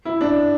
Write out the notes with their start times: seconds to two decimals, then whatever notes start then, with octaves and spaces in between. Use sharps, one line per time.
0.05 E4
0.21 D4